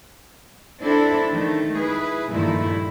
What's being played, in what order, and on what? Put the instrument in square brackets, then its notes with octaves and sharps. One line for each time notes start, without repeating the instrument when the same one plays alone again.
[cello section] C4 D4 E4 A4
D#3 A3
E4 G#4 B4
G2 A#2 D#3 F3 A3 E4